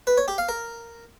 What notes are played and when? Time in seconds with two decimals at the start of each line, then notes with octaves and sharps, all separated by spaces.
0.07 B4
0.17 C#5
0.28 G4
0.38 F5
0.49 A#4